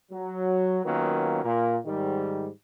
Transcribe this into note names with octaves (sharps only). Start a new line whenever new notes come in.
F#3
D#3 F#3 A#3 B3 C#4 F4
A#2 A#3
G#2 D#3 G3